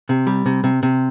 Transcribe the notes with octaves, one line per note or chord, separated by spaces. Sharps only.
C3
G3
C3
C3
C3